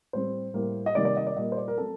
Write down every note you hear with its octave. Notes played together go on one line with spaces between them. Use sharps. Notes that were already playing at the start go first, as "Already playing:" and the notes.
A2 G3 C4 C5
A2 G3 A#3
D#5
C3 D#3 G3 A#3 D5
D5
D#5
D5
A#2 G3 A#3 D#5
C5
D5
A#4
F#3 A3 C4 A4